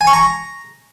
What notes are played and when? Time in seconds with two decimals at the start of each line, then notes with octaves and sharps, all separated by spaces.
0.01 G#5
0.07 C#6
0.13 A#5